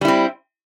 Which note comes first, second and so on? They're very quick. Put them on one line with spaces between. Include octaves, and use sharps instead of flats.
G3 E4 C4